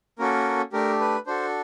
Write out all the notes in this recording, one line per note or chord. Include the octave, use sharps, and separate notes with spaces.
A#3 C#4 F#4 A4 A#4
A3 D4 G4 A#4
B4
D4 F#4 A4 C5